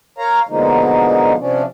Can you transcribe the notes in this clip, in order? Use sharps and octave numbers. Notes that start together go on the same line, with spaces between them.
A#4 C#5 F5 A#5
B2 D3 F3 G#3 A#3 D#4
C3 F3 C#4 D4